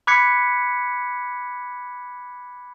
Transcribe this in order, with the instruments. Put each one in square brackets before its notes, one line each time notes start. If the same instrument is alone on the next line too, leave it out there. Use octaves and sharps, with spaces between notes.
[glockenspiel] B5 D6 F#6 G#6 B6 C#7